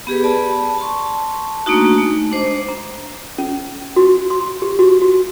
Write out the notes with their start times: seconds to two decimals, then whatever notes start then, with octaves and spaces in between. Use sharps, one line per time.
0.07 B3 G4 G#4 B4
0.24 D5 A5 B5
0.78 A5 C6 C#6
1.66 A3 A#3 D4 D#4 F#4
1.98 G#3 A3
2.31 D4 C5 D#5 D6
2.69 A#5
3.38 C#4
3.96 F#4
4.30 C6
4.62 G4
4.79 F#4
5.02 F#4